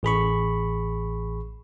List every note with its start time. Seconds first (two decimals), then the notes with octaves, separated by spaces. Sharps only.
0.03 A1 G#4 B5 C#6